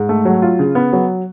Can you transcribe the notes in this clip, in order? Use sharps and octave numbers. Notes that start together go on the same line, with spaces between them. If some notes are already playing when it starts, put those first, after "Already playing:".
Already playing: G#2
A3
F#3
F4
C#3
B3
F#3